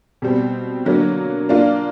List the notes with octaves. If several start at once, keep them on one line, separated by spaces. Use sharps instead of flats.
B2 G3 C4
D3 F#3 A#3
A#3 D4 F4